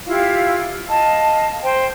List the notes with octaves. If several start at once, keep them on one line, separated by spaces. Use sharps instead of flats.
E4 F4 G4 F5
D#5 F5 A5
C5 G5